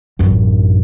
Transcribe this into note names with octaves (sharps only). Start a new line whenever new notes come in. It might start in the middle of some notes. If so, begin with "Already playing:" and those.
A1 F#2